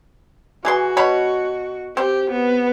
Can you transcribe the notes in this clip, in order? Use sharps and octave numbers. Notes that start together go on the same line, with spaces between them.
E3 F#4 G#4 C6
B2 C#5 B5
C4 G4
B3